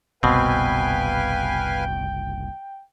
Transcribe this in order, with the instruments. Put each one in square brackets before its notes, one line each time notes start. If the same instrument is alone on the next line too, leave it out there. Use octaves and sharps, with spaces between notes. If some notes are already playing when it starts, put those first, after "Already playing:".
[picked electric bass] F#1 C2 [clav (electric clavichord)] B2 C4 [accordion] B4 F5 G#5 [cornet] G5